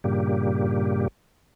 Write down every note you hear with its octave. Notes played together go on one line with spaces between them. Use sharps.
G2 A#2 C#3 G3 A#3 G4